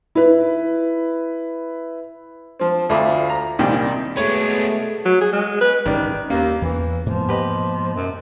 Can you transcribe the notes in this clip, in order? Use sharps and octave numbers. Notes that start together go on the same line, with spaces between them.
E4 B4
F3 C4
D2 A3 F4 B5 D6 D#6
A#5
C2 A#2 D#3 G3 G5
B2 G#3 A3 B3 D4 G#4 C#5
F#3
G#4
G#3
B4
G#1 D#3 E3 G3 C#4 D5
D#2 A#3 C#4
E2 E3
G#2 B2 F3 A#3
G4 B4 D#5
F#2